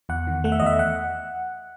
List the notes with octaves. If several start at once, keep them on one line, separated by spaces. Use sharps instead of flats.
E2 F#5
D#3
A3 F#5
E5
D#5
E2 E5
F#5